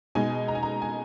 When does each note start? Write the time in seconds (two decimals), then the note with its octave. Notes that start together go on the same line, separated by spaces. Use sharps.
0.15 B2 G#3 D#4 G#5
0.48 A#5
0.55 G#5
0.63 A#5
0.82 G#5